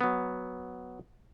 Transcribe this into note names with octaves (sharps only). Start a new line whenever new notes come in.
F#3 B3